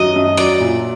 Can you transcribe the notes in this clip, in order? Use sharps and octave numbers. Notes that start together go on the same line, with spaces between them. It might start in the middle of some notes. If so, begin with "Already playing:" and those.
Already playing: F#2 D#3 F#3 D#5
F#2
F#3 D5
A#2